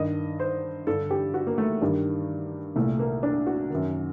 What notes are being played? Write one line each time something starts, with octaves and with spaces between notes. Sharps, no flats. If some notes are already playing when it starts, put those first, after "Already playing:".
Already playing: G2 D#3 D#5
C5
G2 D3 A4
G4
F#4
A#3
A3
G2 D#3 G3
C2 A#2 A3
A#3
D4
F#4
F#2 D#3